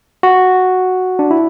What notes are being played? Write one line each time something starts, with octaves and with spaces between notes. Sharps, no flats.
F#4
D4
E4